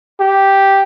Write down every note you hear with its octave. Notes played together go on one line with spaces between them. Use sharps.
G4